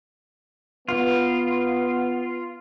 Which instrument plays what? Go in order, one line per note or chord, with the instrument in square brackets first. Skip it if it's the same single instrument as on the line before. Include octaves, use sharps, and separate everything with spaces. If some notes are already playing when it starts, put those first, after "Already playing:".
[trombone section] B3 [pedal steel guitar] F4